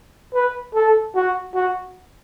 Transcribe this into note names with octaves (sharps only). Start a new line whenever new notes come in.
B4
A4
F#4
F#4